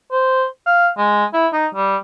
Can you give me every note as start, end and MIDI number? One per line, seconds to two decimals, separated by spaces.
0.11 0.45 72
0.66 0.89 77
0.98 1.25 56
1.33 1.47 64
1.53 1.66 63
1.74 1.96 55